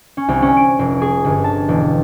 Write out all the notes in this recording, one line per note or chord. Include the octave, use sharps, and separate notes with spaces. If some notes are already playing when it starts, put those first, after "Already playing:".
C#4
C2
C#4
D7
F1
G#4
G1
A5
E1